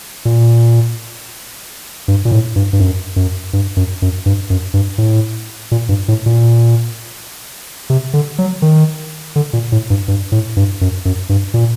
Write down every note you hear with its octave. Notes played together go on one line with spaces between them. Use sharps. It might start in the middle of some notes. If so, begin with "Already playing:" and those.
A#2
G2
A#2
A2
G2
G2
F#2
F#2
G2
F#2
F#2
G2
F#2
G2
A2
A#2
G2
A2
A#2
C3
D3
F#3
D#3
D3
A#2
A2
G2
G2
A2
G2
F#2
F#2
G2
A#2